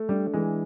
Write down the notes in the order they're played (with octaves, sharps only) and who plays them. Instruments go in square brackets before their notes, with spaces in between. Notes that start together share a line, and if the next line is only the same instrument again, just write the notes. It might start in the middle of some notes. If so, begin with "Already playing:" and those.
Already playing: [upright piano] A3
[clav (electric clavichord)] G3 [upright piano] D4
[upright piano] E3 [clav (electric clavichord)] G#3